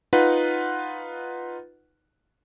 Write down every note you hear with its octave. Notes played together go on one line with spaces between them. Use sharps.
D#4 F4 B4 F#5